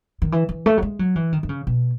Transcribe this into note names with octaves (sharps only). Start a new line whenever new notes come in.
D#3
E3
E3
A3
F#3
G#3
F#3
E3
D#3
D#3
C#3
B2